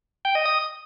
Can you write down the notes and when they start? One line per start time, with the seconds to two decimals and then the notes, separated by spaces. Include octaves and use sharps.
0.25 G5
0.35 D#5
0.46 D#6